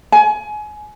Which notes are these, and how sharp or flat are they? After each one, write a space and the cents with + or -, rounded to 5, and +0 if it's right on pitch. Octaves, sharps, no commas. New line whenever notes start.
G#5 +25